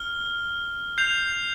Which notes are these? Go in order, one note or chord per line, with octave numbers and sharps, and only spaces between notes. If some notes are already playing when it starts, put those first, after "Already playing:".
Already playing: F6 G7
G6 C7 F7